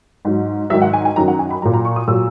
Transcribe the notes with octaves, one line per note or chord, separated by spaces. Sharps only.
G#2 F#3
G#2 D#3 F#3 E5
F#5
G#5
G#5
F#2 D#3 F#3 A#5
F#5
G#5
B5
A#2 F#3 A#5
A#5
C#6
D#6
A#2 F#3 E6